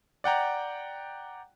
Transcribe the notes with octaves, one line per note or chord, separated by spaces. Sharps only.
D5 F#5 G5 A#5